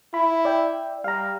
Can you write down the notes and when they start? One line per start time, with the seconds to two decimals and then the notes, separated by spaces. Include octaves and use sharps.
0.14 E4 B5
0.45 D5 E5 G5
1.04 G3 F5 A#5